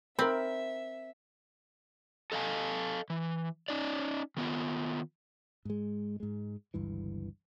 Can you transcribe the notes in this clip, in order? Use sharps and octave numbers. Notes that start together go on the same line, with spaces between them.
C4 A#4 E5 B5
A4 D#5 F5 G#5 A5
E3
C#4 D#4 D5
D#3 B3 F4
G#2 G#3
G#2 G#3
G1 C#2 G2 E3